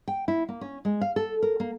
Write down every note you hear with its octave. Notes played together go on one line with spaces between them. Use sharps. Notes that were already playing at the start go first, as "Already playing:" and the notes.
G5
E4
A#3
C#4
G#3
F5
A4
A#4
A#3